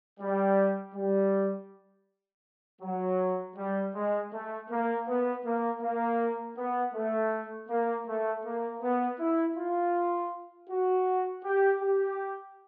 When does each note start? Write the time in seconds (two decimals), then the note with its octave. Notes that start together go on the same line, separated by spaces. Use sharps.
0.20 G3
0.95 G3
2.82 F#3
3.56 G3
3.95 G#3
4.32 A3
4.69 A#3
5.07 B3
5.45 A#3
5.82 A#3
6.57 B3
6.94 A3
7.69 A#3
8.07 A3
8.44 A#3
8.81 B3
9.19 E4
9.57 F4
10.69 F#4
11.44 G4
11.81 G4